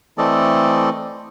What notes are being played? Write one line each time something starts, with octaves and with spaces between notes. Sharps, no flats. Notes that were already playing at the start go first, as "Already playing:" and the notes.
E3 A3 C4 A4 D5 D#5